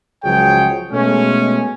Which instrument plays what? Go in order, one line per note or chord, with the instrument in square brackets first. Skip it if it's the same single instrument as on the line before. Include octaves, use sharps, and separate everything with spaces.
[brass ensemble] C#2 F3 F#3 G#4 C#5 G5
B2 G#3 A3 C#4